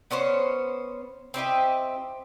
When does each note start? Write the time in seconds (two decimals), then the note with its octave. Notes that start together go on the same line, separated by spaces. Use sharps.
0.11 B3 C#4 C5 C#5
1.34 C4 E4 G4 D#5